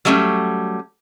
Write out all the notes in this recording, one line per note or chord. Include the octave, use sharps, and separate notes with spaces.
F#3 G3 A3 C4 C#4